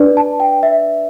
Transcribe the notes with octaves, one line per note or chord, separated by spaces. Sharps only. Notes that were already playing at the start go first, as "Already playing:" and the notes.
Already playing: D4 B4 D5
A5
G5
E5